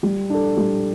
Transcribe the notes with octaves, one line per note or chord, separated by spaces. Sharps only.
G3
D4 A4
G3